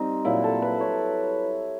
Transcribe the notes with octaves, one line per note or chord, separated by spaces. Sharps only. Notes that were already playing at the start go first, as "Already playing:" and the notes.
Already playing: G3 C4 D#4
A#2 F#3 A#3 E4
A4
B4
C#5